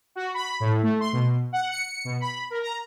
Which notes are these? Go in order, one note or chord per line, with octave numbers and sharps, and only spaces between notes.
F#4
B5
A2
A3
C6
B2
F#5
C#7
B2
B5
A#4
A#5